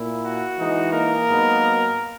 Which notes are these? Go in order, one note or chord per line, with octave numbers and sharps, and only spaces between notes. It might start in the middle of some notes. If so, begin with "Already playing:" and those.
Already playing: A#2 A#3 E4
F#4
E3 G#3 D#4
A#3 A#4
G#2 F#3 B3 D#4